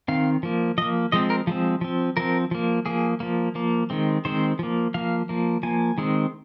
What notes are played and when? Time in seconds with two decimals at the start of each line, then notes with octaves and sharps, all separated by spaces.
0.08 D#3 C4 F5
0.43 F3 A#3
0.78 F3 A#3 D#5
1.12 F3 G#3 C4 D#5
1.30 A#4
1.47 F3 G#3 C4
1.81 F3 C4
2.17 F3 C4 A#4
2.51 F3 A#3
2.86 F3 A#3 G#4
3.20 F3 A#3
3.55 F3 A#3
3.90 D#3 G#3 C4
4.25 D#3 G#3 C4 C5
4.59 F3 A#3
4.94 F3 A#3 F5
5.29 F3 A#3
5.63 F3 A#3 G#5
5.98 D#3 G#3 C4